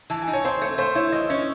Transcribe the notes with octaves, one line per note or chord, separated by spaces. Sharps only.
E3 A5
G#5
D#4
C#5
C4 C5
A3 C#5
A3 C5
E4 C#5
E3 D#5
C#4 C#5